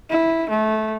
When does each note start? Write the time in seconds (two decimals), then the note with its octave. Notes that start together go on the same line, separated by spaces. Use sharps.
0.10 E4
0.50 A3